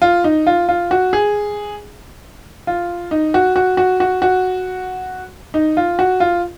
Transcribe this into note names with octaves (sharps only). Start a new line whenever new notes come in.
F4
D#4
F4
F4
F#4
G#4
F4
D#4
F#4
F#4
F#4
F#4
F#4
D#4
F4
F#4
F4